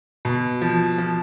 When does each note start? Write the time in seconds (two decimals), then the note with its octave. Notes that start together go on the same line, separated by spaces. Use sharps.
0.25 B2
0.61 F3
0.98 F3